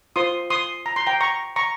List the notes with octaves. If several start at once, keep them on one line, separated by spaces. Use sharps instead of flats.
F4 C5 C6 D#6
C6 D#6
A#5
C6
G5 A#5
A#5 C#6
A#5 C#6